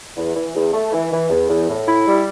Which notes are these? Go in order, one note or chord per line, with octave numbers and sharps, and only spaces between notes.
E2
E3
E2
A3
E3
E3
E2
E2
A2
E4
G3